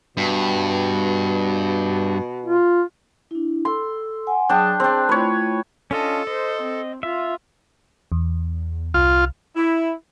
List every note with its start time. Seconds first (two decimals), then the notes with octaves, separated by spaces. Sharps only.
0.17 G2 B2
2.46 F4
3.31 D4 E4
3.65 A4 C6 E6
4.27 F#5 G#5
4.49 F#3 D4 G#4 G5 A5 D#6
4.80 C4 D4 G#4
5.09 A3 E4 F4 B4 C#5
5.91 C#4 D4 F4 A4 D#5
6.27 C5 D#5
6.62 C4
7.03 F4 E5
8.12 E2
8.94 C2 F4
9.56 E4